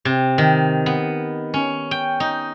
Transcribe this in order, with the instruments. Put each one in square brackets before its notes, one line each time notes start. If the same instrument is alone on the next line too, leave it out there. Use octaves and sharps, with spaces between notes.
[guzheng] C3
D#3
B3
C#4
G5
D#4